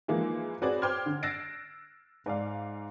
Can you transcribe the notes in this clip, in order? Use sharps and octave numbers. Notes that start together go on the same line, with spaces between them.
E3 F3 G#3 A#3 D#4 E4
C4 F#4 G#4 B4 C#5 D5
C5 G5 C6 D6 F6 G#6
D3
E6 F#6 A6 A#6 C7 D7
G#2 D5 F5